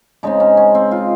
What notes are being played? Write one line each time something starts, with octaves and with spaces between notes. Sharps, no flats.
C#3 G#3 C4 D#4
C#4
C#4
C4
F4